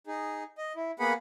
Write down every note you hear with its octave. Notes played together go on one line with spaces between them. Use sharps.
D#4 G#4
D#5
E4
A#3 B3 G#4 B4 F#5 B5